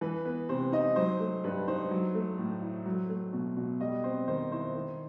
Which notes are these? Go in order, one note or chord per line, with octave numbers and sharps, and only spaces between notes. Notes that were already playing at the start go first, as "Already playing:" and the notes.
E3 B4
B3 B4
C3 C5
D#4 D#5
F#3 C5
A3
G2 B4
D#4 C5
F#3
A3
A2
E4
F#3
A3
B2
B2
G3 D#5
C4 C5
D#3 C5
E4 C5
D#3